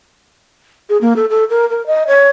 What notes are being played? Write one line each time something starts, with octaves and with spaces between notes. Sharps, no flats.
G#4
A#3
A4
A4
A#4
A#4
D#5
C#5